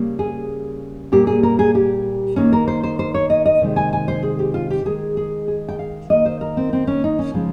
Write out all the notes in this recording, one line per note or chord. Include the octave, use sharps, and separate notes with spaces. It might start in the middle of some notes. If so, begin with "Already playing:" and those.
Already playing: C#3 G3 A#3
G#4
A#2 G3 A#3 G4
G#4
A#4
G#4
G4
D#3 A#3 C#4
A#4
C5
C5
C5
C#5
D#5
D#5
C3 D#3 G#3
G#5
G#5
C5
G#4
G4
F4
G4
D#3 G#3 G#4
G#4
G#4
G5
F5
D#3 A#3 D#5
C5
A#4
C4
C4
C#4
D#4
C#4
C#3 F3 G#3